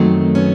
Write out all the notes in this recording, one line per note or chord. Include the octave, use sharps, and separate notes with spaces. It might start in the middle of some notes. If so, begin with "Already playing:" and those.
Already playing: F#2 D#3 F#3 A3 C4
B3 C#4